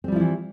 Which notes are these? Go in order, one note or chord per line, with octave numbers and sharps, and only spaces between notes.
E3 F3 G3 C4 E4